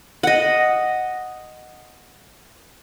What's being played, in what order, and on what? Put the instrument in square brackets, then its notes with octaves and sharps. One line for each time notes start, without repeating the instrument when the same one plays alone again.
[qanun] D#5 F#5